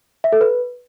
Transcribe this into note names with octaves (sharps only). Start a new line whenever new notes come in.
E5
A4
B4